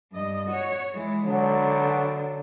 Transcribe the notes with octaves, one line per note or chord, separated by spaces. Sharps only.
G2 D#5
F#4 C#5
E3 G#3
D3 F#3